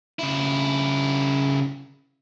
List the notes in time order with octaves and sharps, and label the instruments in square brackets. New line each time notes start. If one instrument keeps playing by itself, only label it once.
[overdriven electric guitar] C#3 E4